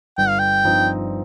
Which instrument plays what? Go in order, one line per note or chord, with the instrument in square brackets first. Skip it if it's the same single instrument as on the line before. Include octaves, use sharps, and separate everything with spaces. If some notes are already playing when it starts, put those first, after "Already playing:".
[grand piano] G1 [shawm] G5
[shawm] F5
G5
[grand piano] G2 F3 C4 D#4